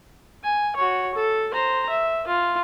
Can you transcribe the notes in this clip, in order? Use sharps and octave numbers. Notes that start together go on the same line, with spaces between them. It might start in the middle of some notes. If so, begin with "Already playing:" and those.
G#5
F#4 C#5
A4
C5 A#5
E5
F4